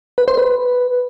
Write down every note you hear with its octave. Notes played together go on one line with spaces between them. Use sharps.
B4
C5
B4